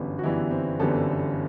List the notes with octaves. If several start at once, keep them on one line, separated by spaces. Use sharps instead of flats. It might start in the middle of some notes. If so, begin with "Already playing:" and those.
Already playing: G1 F#2 E3 G3 B3 B4
F#4
G1 F#2 E3 G3 B3 E4
C4
G1 F#2 E3 G3 B3 A4